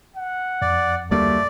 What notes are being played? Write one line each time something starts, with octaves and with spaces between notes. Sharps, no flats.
F#5
F2 D5
D2 G3 A3 A#3 D5